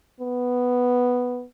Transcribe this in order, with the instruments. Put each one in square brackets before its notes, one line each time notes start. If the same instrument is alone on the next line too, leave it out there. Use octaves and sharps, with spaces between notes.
[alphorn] B3